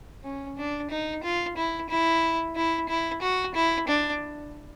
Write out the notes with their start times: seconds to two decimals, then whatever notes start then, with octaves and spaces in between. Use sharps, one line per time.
0.24 C#4
0.58 D4
0.91 D#4
1.24 F4
1.57 E4
1.90 E4
2.56 E4
2.89 E4
3.22 F#4
3.55 E4
3.88 D4